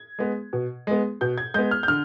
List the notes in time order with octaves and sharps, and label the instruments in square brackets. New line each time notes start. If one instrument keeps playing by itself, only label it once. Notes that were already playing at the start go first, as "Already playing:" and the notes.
Already playing: [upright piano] G#6
G#3 B3
B2
G#3 B3
B2 G6
G#6
G#3 B3 G6
F6
G6
D3 F6